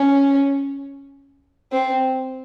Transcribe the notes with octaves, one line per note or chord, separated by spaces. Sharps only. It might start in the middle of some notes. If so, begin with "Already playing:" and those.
Already playing: C#4
C4